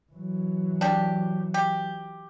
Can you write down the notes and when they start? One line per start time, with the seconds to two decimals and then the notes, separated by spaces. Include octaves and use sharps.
0.12 E3 F#3
0.81 D4 G4
1.54 G4